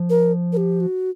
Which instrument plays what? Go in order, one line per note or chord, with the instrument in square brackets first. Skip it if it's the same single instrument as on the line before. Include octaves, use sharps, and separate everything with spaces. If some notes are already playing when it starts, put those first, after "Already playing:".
Already playing: [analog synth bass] F3
[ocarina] A#4
A#4
G4
F#4